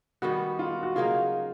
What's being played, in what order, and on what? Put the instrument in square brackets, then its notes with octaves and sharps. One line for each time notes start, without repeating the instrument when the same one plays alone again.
[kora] D#3 G3 B3 [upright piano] F#4
[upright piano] F4
F#4
[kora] C#3 F#3 A#3 D#4 [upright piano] F4